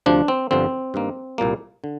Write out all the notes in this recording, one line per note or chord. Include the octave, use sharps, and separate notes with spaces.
D2 C3 F3 D4
C4
G1 G2 D3 F3 C4
G2 D#3 A#3
C2 A#2 G3 A#3
D3